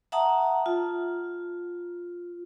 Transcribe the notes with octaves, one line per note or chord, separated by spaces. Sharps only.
E5 F#5 A5 A#5 D#6
F4